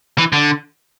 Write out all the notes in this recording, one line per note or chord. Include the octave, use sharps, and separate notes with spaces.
E3
D3